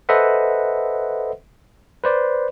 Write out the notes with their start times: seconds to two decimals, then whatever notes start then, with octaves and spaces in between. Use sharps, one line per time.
0.09 A4 B4 C5 D#5 E5 F#5
2.04 B4 C5 D5